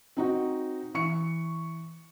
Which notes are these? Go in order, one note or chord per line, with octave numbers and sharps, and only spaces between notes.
C4 D#4 F#4
E3 C#6 C#7